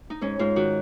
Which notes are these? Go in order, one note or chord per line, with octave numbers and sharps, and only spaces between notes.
D#4
G#2 C#4
G#2 F4
D#3 F#4